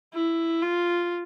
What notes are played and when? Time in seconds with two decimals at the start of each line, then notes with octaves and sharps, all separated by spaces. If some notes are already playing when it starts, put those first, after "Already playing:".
0.14 E4
0.62 F4